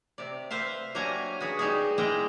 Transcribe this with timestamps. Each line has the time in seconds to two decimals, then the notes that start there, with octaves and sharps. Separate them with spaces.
0.18 C3 D5
0.51 B4 C5 E5 F5
0.95 F#3 A#3 D4 G4 G#5 A#5
1.40 F#4 G#4 B4
1.59 G3 D#4 G#4
1.98 G#3 A#3 E4 G5 A#5